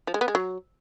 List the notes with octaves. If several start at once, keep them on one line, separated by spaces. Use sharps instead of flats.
F3
G#3
B3
G#3
F#3